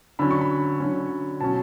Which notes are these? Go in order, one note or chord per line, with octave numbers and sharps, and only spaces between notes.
D3 F#3 C#4 B5
C#6
B5
D3 F#3 C#4
B2 F#3 C#4 A5